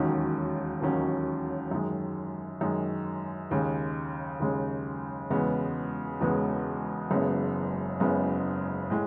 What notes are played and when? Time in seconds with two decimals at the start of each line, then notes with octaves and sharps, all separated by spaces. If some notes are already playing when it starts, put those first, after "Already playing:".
Already playing: E1 D#2 D#3 F#3 C#4
0.81 E1 D#2 D#3 F#3 C#4
1.71 F#2 D#3 G#3
2.61 F#2 D#3 G#3
3.51 D#2 C#3 G#3
4.40 D#2 C#3 G#3
5.30 E1 E2 C#3 G#3 B3
6.21 E1 E2 C#3 G#3 B3
7.11 F#1 F#2 C#3 G#3 B3
8.00 F#1 F#2 C#3 G#3 B3
8.90 A2 G#3